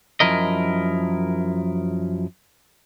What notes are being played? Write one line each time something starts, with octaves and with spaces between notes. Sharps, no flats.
F#2 F3 E4 A#4 D#5